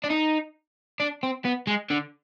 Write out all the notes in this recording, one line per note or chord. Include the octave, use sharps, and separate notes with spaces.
D4
D#4
D4
C4
B3
G#3
D3